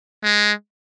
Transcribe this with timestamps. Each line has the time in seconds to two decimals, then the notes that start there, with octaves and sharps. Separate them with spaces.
0.23 G#3